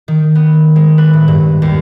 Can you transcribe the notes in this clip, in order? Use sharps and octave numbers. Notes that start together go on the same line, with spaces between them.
D#3
B3
G#3
B4
A2
G2
D#2